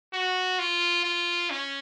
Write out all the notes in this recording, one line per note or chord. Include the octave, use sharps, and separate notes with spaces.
F#4
F4
F4
C#4